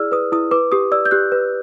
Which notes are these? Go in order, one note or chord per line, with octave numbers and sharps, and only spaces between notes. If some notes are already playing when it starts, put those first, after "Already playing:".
Already playing: E4 G#4 D5 E6 F6
B4 D#6
E4 D#6
B4 D6
G4 D#6
D5 E6
G6
G4 F#6
B4